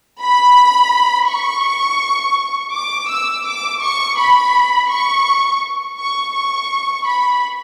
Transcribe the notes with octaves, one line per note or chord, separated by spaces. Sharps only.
B5
C#6
D6
E6
D6
C#6
B5
C#6
C#6
C#6
B5